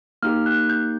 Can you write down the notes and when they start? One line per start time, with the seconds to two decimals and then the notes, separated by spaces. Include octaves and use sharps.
0.23 A#3 D#4 G4 F6
0.46 F#6
0.70 G6